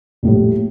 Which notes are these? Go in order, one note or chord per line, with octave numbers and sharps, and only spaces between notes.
A#1 A2 G3